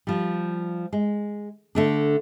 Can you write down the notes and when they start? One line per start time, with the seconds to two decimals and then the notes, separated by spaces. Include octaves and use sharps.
0.07 F3 G3
0.93 G#3
1.75 D3 A3 D4